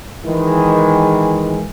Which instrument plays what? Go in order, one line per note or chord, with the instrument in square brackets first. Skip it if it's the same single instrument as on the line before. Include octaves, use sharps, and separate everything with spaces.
[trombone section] D#3 E3 G#3